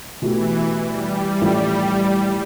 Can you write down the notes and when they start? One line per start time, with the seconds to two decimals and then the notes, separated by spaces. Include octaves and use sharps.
0.22 B2 E3 A3 E4 G4
0.82 G3
1.41 A1 A2 F3 A3